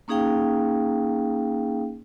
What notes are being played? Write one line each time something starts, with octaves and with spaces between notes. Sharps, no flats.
A#3 C#4 D#4 G#4 F5 G5